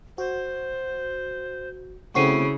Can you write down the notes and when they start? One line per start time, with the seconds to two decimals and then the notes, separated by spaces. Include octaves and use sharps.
0.18 F#4 C5
2.15 C#3 A3 C4 E4 F#4 C#6 C7 D#7